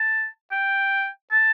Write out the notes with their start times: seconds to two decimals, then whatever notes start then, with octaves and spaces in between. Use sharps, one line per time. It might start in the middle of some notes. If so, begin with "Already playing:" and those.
Already playing: A5
0.52 G5
1.32 A5